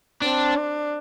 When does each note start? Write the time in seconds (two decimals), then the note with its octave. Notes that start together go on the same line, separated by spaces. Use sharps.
0.22 C4 D4
0.56 D4